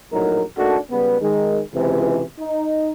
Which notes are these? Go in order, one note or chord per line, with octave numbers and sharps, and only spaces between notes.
A#1 A2 F#3 D#4 A#4
A3 A#3 D4 D#4 F#4 A4
C#2 C#3 G3 B3
D#3 G#3
C#2 C3 E3
D#4